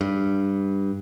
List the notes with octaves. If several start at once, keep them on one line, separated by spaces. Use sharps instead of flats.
G2